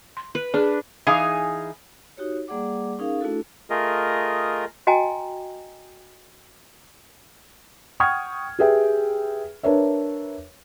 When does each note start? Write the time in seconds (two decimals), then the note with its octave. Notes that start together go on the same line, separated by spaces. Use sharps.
0.17 C6
0.35 B4
0.54 D4 G#4
1.07 E3 D#4 G#4 F5 G#5
2.17 D#4 F#4 G4 C#5
2.48 G3 A#3 G#4 D5 F#5 D6
2.99 C#4 D#4 G#4 A#4 F5
3.21 A3 D4 E4 F#4 A4
3.70 A3 F4 G#4 A#4 D#5
4.87 F#4 D#5 G5 G#5 A#5
8.00 F#5 G5 C#6 D#6 F6 G#6
8.59 G4 G#4 B4 E5 G5
9.63 D4 A#4 B4 C#5 E5